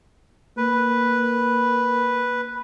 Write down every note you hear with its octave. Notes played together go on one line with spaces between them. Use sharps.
A#3 B4